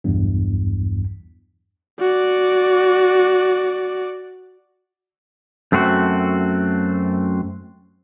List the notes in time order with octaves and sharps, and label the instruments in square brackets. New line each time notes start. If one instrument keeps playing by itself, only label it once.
[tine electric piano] B1 E2 G2
[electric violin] F#4 D5
[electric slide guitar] F#2 A3 C4 F4 F#4